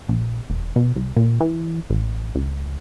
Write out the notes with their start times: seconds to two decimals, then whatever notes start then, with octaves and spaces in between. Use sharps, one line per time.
0.09 A#1
0.50 E1
0.76 B2
0.96 C2
1.16 A#2
1.40 E3
1.90 A1
2.35 C#2